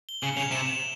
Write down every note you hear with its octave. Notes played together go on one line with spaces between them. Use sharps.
G7
C#3 F#7
C#3 F7
C3 E7